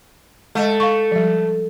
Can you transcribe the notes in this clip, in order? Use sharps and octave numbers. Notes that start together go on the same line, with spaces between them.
G#3 A3 D#5
F5 C#6
F3 G3